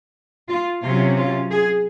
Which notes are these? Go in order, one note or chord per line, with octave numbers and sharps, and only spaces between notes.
F4
C3 F#3 C#4 F4
F4
G#4